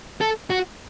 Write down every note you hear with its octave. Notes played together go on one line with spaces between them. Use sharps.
A4
F#4